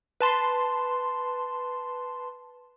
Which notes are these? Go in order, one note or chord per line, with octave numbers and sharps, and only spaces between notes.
B4 A5 C6